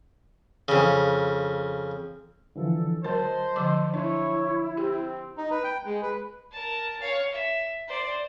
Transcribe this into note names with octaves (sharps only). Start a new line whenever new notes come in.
F2 C#3
D3 E3 F3 A4
D2 F#3 A#4 C5 D#5 A5
D3 F3 D6
D4 E4 C#5
C4 G4
D#4
B4
G5
G#3
B4
A#4 A5
C#5 F5
E5
C5 D5